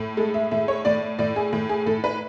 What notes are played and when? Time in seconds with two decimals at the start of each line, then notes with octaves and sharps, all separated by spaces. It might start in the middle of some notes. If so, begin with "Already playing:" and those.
Already playing: A2
0.17 G#3 A4
0.34 E5
0.51 A2 E5
0.68 C#5
0.85 A2 D5
1.19 A2 D5
1.36 G#4
1.53 A2
1.69 G#4
1.86 A2 A4
2.04 B4